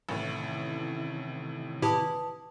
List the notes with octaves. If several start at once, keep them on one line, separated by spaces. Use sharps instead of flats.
A1 A2 C3 D#3 E3
A2 E4 G4 B4 A5 D#6